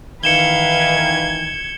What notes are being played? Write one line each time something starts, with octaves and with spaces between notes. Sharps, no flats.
D#3 E3 B4 F5 G#6 C#7 E7 G7